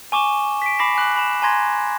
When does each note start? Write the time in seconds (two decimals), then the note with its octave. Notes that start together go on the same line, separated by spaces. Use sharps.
0.12 G#5 C#6 D6 E7 G7
0.62 B6 D7
0.79 B5 D6 A#6 C7 E7
0.95 G#5 D6 F#6 F#7
1.17 B5 E7
1.42 G#5 A#5 C6 G#6 A#6